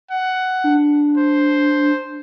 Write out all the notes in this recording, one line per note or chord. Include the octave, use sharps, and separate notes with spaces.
F#5
D4
C5